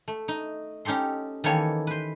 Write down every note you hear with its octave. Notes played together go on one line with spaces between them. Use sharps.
A3
D#4
C#4 D#4 G4 A4 C6
D#3 E3 A#3 A4 C#5
B4 C5